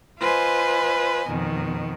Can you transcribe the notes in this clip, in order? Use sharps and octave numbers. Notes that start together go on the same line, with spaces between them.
F4 B4 C5 D#5 G#5
F2 B2 D#3